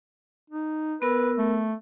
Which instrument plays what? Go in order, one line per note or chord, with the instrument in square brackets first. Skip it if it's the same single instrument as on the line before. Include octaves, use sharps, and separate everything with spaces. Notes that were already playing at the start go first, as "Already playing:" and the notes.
[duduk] D#4
[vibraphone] B3 A#4 E6 [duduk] B4
[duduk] A3